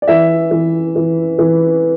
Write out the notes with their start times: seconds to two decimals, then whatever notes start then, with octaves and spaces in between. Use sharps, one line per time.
0.02 D5
0.08 E3 E5
0.51 E3
0.96 E3
1.39 E3